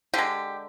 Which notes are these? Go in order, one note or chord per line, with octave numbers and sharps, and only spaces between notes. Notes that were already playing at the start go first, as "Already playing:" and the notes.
D3 G#3 G4